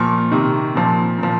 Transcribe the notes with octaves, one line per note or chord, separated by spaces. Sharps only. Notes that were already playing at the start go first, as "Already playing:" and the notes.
Already playing: A#2 F3 C#6 F6
C3 D#3
A#2 F3
A#2 F3